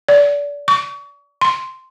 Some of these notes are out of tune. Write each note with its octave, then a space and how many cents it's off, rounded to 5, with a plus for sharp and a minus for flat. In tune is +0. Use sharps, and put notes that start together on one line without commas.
D5 -25
C#6 +35
C6 -5